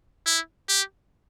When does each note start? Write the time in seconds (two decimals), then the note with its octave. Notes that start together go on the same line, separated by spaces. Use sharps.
0.26 E4
0.69 G4